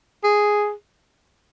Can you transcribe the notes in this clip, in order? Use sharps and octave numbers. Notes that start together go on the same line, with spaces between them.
G#4